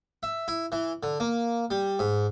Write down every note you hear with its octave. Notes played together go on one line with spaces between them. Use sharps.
E5
E4
E3
D3
A#3
G3
G#2